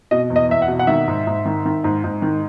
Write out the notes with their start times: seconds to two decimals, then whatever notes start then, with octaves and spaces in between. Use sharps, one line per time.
0.11 B2 D#5
0.30 E2
0.36 D#5
0.49 E2 E5
0.62 F#5
0.68 B2
0.79 F#5
0.87 D#3 E5
1.07 G#2
1.27 G#2
1.45 D#3
1.65 D#3
1.84 G#2
2.04 G#2
2.22 D#3